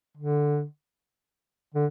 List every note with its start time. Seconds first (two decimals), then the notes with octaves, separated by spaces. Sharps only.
0.17 D3
1.74 D3